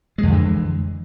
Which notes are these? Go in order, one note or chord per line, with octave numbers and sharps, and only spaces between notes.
F2 D3 E3 G#3